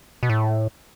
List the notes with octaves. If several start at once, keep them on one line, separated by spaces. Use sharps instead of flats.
B2
A2